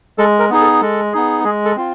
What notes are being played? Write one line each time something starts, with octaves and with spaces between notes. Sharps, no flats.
G#3 A4
A#4
B3 D#4 G#4
A4
G#3 A4
B3 D#4 G#4
G#3 G#4
A4
C4 F4